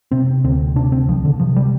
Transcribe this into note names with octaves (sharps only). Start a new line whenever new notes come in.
C3 C4
D2 C4
C3 D4
C4
C2 F3
D3
C3 F3
G3